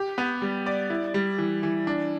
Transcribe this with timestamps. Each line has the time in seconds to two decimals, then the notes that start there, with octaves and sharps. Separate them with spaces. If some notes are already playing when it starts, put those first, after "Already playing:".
Already playing: G4
0.18 B3
0.42 G3
0.66 D5
0.90 E4
1.14 G3
1.38 E3
1.63 E3
1.87 D4